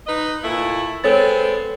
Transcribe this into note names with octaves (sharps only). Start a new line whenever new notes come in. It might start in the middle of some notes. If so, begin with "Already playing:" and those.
D#4 B4 D#5
A#2 A3 E4
G#3 B3 C4 A4 C#5 A6